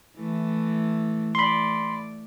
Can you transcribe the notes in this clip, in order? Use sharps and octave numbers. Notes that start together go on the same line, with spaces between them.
E3 A3
A3 D5 B5 C6